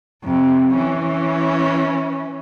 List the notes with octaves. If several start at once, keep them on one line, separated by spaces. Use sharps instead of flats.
F2 C3
E3 C#4